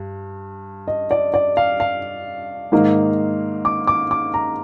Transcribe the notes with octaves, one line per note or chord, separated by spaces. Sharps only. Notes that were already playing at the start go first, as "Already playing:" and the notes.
Already playing: G2
D#5
D5
D5
F5
F5
G#2 D#3 A#3 D#4
D6
D6
D6
A#5